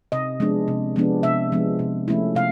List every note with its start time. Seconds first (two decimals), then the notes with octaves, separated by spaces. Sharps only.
0.12 C3 D#5
0.40 F3 G#3 B3 D4
0.68 C3
0.96 F3 G#3 B3 D4
1.23 C3 E5
1.52 F3 G#3 B3 D4
1.79 C3
2.08 F3 A3 C#4 E4
2.35 C3 F5